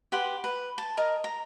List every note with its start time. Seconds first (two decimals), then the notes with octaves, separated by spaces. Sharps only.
0.12 G4 B4 F#5 C6
0.44 B4
0.78 A5
0.97 A#4 D#5 A#5
1.24 A#5